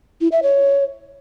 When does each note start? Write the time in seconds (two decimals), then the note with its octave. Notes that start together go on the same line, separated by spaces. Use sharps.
0.21 E4
0.32 E5
0.43 C#5